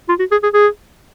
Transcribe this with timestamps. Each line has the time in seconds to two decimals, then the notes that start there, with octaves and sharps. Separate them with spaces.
0.09 F4
0.19 F#4
0.31 G#4
0.43 G#4
0.54 G#4